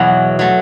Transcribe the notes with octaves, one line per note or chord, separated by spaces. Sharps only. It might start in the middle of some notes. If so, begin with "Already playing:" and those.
Already playing: E2 B2 F#3
F#3 A3